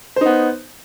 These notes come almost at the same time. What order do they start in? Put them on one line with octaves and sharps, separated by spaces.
C5 D#4 B3